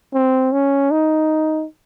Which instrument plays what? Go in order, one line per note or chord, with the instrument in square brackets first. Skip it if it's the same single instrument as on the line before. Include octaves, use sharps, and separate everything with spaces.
[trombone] C4
C#4
D#4